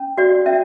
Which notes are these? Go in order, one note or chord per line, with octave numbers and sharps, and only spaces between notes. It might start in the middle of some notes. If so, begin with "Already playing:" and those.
Already playing: C#4
F#4 D5
C#4 E5